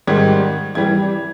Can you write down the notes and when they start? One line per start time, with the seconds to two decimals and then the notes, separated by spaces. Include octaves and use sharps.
0.07 G#2 D#3 G3 G#6
0.75 E3 G3 G#6